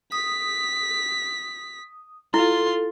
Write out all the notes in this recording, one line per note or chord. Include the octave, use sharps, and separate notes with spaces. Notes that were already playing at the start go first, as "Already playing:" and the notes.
D#6 B6
E4 F4 A4 C6